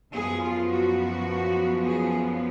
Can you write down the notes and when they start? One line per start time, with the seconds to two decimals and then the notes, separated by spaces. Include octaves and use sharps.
0.13 F#2 F3 B3 G#4
0.41 F4
0.70 F#4
1.83 G#4